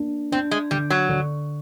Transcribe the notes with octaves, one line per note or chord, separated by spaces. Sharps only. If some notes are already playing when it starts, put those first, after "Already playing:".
Already playing: A#3 D4
C4 D4
G#3
D3 G3
F#3
D3